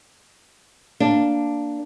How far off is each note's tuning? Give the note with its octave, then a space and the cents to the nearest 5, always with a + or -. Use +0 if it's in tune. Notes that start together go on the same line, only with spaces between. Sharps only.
A#3 -5 D4 +0